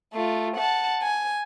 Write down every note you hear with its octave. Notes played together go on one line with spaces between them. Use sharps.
A3 F4
F#5 A5
G#5